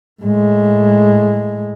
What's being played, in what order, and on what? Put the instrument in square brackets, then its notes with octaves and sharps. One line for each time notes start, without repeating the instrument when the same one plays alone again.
[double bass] A2 G#3